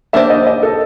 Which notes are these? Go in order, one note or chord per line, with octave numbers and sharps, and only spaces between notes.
A#3 D4 G4 C5 E5
D#5
D#5
A4